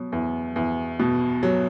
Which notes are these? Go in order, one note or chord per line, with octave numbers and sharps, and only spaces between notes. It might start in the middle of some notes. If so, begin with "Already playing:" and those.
Already playing: B2 F#3
E2
E2
B2
F#3